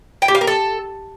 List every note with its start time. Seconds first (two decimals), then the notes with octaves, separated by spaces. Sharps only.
0.22 G5
0.28 G4
0.35 F5
0.41 A#4
0.47 A4